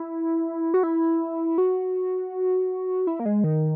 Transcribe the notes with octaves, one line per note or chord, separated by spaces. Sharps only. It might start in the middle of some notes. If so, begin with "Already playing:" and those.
Already playing: E4
F#4
E4
F#4
E4
A#3
G#3
D#3